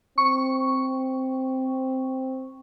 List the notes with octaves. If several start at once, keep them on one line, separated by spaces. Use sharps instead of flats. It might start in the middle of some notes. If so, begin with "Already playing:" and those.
C4 C#6